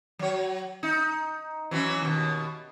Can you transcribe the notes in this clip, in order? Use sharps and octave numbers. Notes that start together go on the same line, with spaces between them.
F#3 C#5
D#4
E3 F#3 C#4
D#2 B2